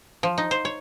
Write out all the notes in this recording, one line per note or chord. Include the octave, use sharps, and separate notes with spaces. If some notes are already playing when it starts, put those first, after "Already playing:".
F3
D#4
C5
C#5